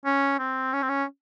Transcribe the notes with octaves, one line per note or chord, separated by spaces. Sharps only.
C#4
C4
C#4
C4
C#4